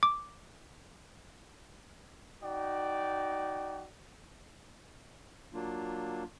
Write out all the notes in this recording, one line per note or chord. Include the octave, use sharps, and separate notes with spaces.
D6
D#4 F#4 D5 G5
F#3 A#3 D4 F4